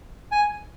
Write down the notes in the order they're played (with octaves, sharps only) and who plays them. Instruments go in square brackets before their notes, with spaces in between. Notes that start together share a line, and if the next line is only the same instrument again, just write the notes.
[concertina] G#5